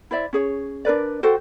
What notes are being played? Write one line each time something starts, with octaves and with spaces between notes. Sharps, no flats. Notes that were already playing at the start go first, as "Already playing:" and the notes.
E4 C5 D5 E5
C#4 G#4 C#5
D4 A#4 B4 D5
F#4 A4 C5 G5